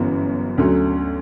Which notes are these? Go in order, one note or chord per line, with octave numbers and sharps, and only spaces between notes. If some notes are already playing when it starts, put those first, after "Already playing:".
Already playing: G1 F#2 E3 B3
D2 D3 F#3 A3 C#4